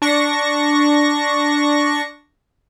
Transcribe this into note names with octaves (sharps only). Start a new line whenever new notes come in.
D4 C#6 A#6